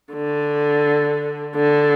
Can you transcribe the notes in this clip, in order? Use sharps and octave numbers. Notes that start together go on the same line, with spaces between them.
D3
D3